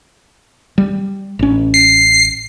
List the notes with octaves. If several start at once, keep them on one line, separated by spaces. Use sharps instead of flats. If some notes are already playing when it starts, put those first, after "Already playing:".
G3
A1 C#4
C7